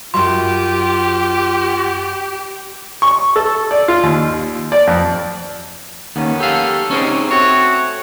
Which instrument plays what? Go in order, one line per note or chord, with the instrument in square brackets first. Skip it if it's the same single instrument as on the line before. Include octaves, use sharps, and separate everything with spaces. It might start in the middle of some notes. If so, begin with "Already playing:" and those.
[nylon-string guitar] F#2 F#3 [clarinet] F4 [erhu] G4 [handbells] C6
[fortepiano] C#6
A4
D5
F4
D#2
D5
F2
[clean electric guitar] D#2 [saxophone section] D#3 B3 C#4
[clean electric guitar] G4 F5 [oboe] A4
[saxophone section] C3 G#3 C4 [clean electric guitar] C#4 D#4 G#4
[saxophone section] A3 C4 [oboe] F#4 [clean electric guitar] C#5